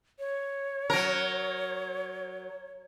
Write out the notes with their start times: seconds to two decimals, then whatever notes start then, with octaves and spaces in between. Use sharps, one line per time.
0.19 C#5
0.90 F#3 A#4